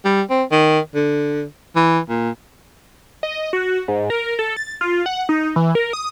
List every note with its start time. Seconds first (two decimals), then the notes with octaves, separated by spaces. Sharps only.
0.05 G3
0.30 C4
0.51 D#3
0.95 D3
1.76 E3
2.09 A#2
3.23 D#5
3.53 F#4
3.88 G#2
4.10 A#4
4.39 A4
4.57 A6
4.81 F4
5.06 F#5
5.29 D#4
5.56 E3
5.75 A#4
5.93 D#6